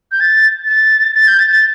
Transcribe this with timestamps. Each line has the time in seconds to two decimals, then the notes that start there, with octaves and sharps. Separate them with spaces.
0.12 G6
0.20 A6
0.67 A6
1.15 A6
1.28 G6
1.39 A6
1.50 A6